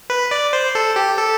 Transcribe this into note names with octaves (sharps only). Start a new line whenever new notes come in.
B4
D5
C5
A4
G4
A4